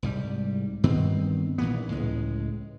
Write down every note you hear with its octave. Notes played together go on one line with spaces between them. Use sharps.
C2 G#2 G3
G2 D#3 B3 C4
A#1 A#2 E3 B3
C#2 A2 G#3